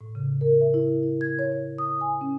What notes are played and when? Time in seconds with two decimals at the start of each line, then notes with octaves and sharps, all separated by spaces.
0.01 A2
0.15 C#3
0.41 A#4
0.61 E5
0.74 E4
1.03 E4
1.21 G#6
1.39 C#5
1.52 C#5
1.78 D#6
2.01 G#5
2.21 C#4